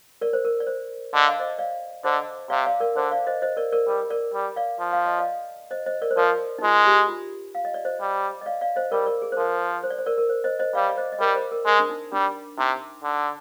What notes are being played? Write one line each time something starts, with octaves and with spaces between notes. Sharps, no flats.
A#4 D5
C5
A#4
D5
C5
D3 D#5
F5
C5 D#5
D5 F5
D3 C5 D#5
C3 D5 F5
D5 F5
A#4 D5
D3 C5
D5 F5
C5 D#5
C5 D#5
A#4 D5
A#4 D5
G3 A#4
A#4 D5
G3
D5 F5
F3
F5
D#5
D5 F5
C5 D#5
C5 D#5
A#4 D5
C5
F3 A#4 D5
D#4
G#3 F4
G4
F4
F5
D#5
D5
C5 D#5
G3
D#5
D5 F5
D5 F5
C5 D#5
G3 A#4 D5
A#4 D5
G#4
C5
F3 A#4
C5
D5
C5
A#4 D5
A#4
C5
C5 D#5
C5 D#5
G3 D5 F5
D5
C5 D#5
D#5
G3 A#4 D5
C5
A#4
G#3 A#4
D4
D#4
G3 D4
C3 D#4
D3